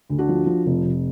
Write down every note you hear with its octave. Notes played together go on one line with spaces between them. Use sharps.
D2
D4 F#4
F3
F3
F1
F1